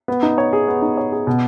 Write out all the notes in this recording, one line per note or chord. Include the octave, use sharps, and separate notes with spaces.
B3
D#4
C#5
G#4
B3
D#4
C#5
G#4
B2